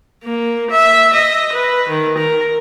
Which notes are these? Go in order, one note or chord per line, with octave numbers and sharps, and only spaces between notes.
A#3
E5
D#5
B4
D#3
A#4